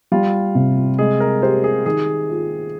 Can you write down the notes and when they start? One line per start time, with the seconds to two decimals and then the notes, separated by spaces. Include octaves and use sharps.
0.12 G3 F4
0.55 C3
0.99 G#3 G#4
1.20 A#4
1.43 G4 C5
1.64 G#4
1.86 D#3 G#4
2.29 F4